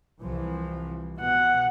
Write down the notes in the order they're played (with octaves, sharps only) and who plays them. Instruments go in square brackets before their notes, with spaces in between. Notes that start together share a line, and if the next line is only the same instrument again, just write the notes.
[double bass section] C2 E3 F3
[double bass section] B2 [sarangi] F#5